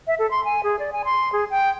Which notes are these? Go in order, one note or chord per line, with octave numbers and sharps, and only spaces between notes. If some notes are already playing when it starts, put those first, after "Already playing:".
E5
A4
C6
G#5
G#4
D5
G#5
C6
G#4
G5